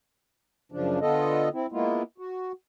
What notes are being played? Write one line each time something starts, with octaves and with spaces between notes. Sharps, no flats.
F#2 C#3 F3 D4
D3 B3 F4 A4 D#5
C4 E4
G#3 A#3 B3 E4 F4
F#4